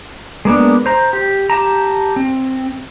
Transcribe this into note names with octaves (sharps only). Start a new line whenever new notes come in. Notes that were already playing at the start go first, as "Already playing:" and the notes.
G#3 A#3 B3 D4
C5 A#5
G4
G4 A5 A#5
C4